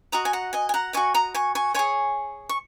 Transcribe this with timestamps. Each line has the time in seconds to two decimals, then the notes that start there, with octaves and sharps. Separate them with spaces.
0.12 F#4 D#5 A#5 D#6
0.25 G#5
0.33 F#5 A#5
0.53 D#5 G#5
0.69 G#5
0.74 F#5 A#5
0.93 F#4 D#5 G#5 C#6
1.14 A#5 D#6
1.34 G#5 C#6
1.55 G#5 C#6
1.74 G#4 C#5 G#5 C#6
2.49 C#6